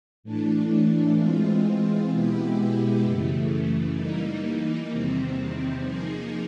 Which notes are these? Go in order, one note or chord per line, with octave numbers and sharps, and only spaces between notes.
A2 E3 A3 D4
E3 G#3 C4 F4
B2 G#3 B3 E4 G4
F#2 C#3 E3 A3
E3 G3 A#3 D#4
E2 C3 D#3 G3 C4
F3 A#3 D#4 G#4